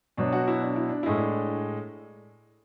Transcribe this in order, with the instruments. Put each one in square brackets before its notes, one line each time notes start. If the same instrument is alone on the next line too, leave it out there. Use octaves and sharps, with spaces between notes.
[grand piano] B2 F#3 D4
F#4
E4
D4
E4
D4
A2 G#3 E4
D4